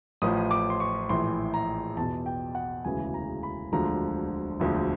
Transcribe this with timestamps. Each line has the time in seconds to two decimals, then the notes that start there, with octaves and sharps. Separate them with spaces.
0.22 A1 A2 F3 D#6
0.51 D6
0.70 C6
0.80 C#6
1.09 A#1 A2 E3 C6
1.54 A#5
1.97 E2 B2 A5
2.26 G5
2.55 F#5
2.85 E1 D2 C#3 E3 G#5
3.14 A#5
3.43 B5
3.72 E1 D2 D3 F3 A#5
4.60 E1 D2 D3 F3